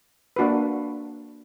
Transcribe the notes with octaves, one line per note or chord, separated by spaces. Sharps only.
A#3 D4 F#4 B4